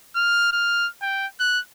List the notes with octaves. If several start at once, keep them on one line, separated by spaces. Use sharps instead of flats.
F6
F6
G5
F#6